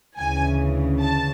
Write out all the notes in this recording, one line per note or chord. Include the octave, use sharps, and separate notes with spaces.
D2 C#3 E3 G#5
A5